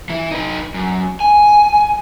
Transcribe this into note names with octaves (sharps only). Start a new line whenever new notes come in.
E3 E4
D#4 B4
F#2
G#5